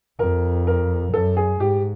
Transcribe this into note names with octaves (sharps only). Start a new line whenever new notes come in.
F2 A#4
A#4
F#2 A4
G#4
G#2 G4